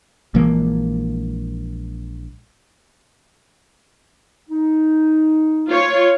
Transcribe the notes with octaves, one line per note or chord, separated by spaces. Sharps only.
A#1 E3 G#3 A#3
D#4
F4 C#5